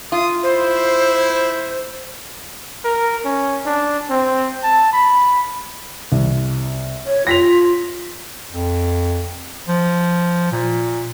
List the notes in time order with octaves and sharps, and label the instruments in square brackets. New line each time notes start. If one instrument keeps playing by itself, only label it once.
[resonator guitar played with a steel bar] F4 [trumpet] D#6
[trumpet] E4 [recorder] C5
[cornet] A#4
C#4
D4
C4
A5
B5
[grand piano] C2
[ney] C#5
[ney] F4 [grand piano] A#6 B6 F7
[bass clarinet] F2
F3
A#2